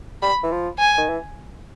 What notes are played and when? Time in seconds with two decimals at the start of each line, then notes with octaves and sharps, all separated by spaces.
0.22 G3 B5
0.43 E3
0.52 F3
0.79 G#5
0.98 D#3
1.09 E3